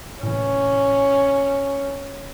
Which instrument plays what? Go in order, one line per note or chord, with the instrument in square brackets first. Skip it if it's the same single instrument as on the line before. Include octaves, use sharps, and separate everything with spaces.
[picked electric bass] A2 C3 E3 [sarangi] C#4